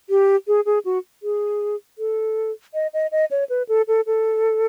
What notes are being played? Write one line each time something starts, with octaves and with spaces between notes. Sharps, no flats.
G4
G#4
G#4
F#4
G#4
A4
D#5
D#5
D#5
C#5
B4
A4
A4
A4